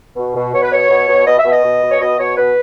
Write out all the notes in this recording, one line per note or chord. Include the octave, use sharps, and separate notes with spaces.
B2
B2
B2 C#5
B4
B2 C#5
B2
B2
B2 D#5
E5
B2
D#5
B2
B2
C#5
B2 D#5
B2 C#5
B2 B4